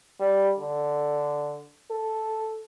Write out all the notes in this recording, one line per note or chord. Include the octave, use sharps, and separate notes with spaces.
G3
D3
A4